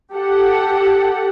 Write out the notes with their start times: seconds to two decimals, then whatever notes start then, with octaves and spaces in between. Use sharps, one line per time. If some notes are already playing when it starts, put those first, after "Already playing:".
0.14 G4 A4 F#5